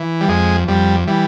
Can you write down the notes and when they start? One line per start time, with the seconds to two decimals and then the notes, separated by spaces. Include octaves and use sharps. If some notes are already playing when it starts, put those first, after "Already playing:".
Already playing: E3
0.21 G3
0.29 F2 G#3
0.68 F2 G3
1.07 E3 G3